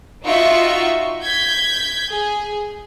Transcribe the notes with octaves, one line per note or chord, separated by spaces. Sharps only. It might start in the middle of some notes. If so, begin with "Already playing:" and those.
D#4 F4 F#4 E5 C#6
G6 G#6 B6
G#4